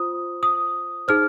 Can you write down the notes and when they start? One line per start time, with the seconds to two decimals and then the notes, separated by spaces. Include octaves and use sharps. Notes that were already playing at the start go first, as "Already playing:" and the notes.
Already playing: F4 C5 D#6
0.43 D#6
1.08 D#4 G#4 C5 F6